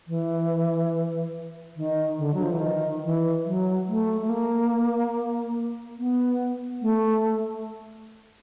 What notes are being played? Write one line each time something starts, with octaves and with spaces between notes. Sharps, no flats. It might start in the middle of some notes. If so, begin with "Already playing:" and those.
E3
D#3
D3
F#3
F3
E3
D#3
E3
F#3
A3
A3
A#3
B3
A3